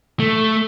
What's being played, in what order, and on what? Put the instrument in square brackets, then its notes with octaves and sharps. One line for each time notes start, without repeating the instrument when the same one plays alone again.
[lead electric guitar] A3